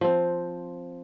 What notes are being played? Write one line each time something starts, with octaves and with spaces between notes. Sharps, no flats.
F3 C4